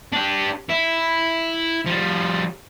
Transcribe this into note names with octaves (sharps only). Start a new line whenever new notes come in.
D4 G4
E4
F3 G3